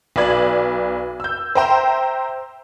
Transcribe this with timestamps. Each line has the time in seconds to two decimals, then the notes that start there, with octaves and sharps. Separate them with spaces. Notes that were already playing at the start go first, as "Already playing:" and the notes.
0.16 B1 B4 D5 G#6
1.20 E6 G6
1.55 C5 E5 G5 A#5 C6